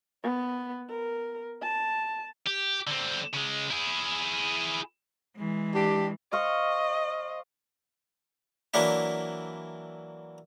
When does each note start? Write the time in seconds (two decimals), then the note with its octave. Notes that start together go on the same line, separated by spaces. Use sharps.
0.23 B3
0.89 A#4
1.62 A5
2.47 G4
2.87 D3 C4
3.33 C#3 G#3
3.71 E4 G#4
5.37 E3 G#3
5.74 D4 G4
6.32 C5 D#5 F5 C#6
8.74 E3 F#3 A#3 D4 E4